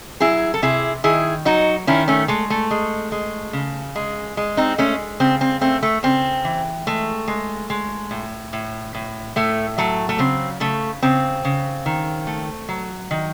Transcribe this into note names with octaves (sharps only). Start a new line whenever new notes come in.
F#3 E4 G#4
A4
C3 E4 G#4
D#3 E4 G#4
F#3 D#4 F#4
D#3 C#4 E4
A3 C#4
G#3 A3
A3
G#3
G#3
C#3
G#3
G#3
C4 D#4
G#3 A3 C#4
C#3 C4
C4
A3 C4
A3
C#3 C4
E3
G#3 A3
G#3
G#3
A2
A2
A2
A2 A3
F#3 A3
A3
C#3 C4
C#3 A3
C#3 C4
C#3
D#3
A3
F#3
D#3